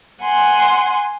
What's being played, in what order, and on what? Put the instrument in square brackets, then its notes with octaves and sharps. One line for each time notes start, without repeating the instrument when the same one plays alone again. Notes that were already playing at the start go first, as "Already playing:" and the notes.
[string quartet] F#5 G#5 C6